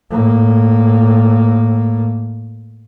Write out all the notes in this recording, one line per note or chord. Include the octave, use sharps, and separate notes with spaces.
A2 A#3